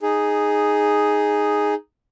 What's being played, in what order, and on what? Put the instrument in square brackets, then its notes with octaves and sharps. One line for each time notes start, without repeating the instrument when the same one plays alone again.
[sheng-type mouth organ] D#4 G#4